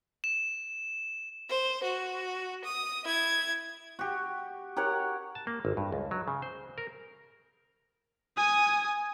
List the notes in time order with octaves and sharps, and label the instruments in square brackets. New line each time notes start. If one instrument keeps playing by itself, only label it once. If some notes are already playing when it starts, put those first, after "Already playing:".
[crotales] E7
[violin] C5
F#4
D#6
E4 G#6
[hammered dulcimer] F#4 G4
G4 A#4 C#5 F#5
[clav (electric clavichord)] A5
A#3
G#1
G2
C#2
F#3
C#3
C5
A#4
[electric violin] G#5 D#6